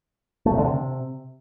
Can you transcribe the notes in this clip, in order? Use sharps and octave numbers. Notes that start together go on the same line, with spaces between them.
A3
C3
D3
C3